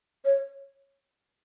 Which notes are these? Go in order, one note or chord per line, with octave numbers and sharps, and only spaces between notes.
C#5